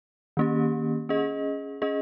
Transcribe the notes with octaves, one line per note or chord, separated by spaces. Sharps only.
D#3 A#3 C#4 G4
C#4 G#4 D#5
C#4 G#4 D#5